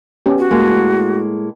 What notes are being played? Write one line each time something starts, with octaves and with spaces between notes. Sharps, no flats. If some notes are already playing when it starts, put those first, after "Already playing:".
B3 C#4 G4
F#4
A2 G#3 A#3